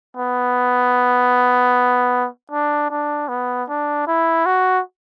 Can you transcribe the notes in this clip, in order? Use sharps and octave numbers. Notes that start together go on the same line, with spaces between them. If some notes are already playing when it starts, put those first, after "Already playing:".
B3
D4
D4
B3
D4
E4
F#4